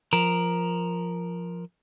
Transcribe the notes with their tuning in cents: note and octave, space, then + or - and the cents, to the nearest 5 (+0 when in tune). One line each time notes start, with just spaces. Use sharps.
F3 +0 A#4 +5